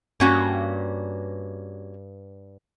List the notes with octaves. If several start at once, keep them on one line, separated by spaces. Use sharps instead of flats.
G2 A#3 C#4 F#4